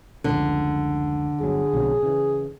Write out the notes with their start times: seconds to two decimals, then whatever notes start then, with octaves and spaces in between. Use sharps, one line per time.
0.24 F1 C#2 D3
1.41 G1 F#3 G#4
1.73 B1 C3 F#3
2.03 C#3 E3